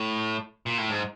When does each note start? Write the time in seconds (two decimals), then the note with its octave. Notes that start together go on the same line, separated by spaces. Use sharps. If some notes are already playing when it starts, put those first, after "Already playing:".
Already playing: A2
0.66 A#2
0.78 A2
0.90 G#2